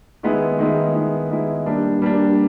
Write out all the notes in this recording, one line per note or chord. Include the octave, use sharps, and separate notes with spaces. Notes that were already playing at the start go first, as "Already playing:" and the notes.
D#3 G#3 B3 E4
D#3 G#3 B3 E4
D#3 G#3 B3 E4
D#3 G#3 B3 E4
G3 A#3 D4
G3 A#3 D4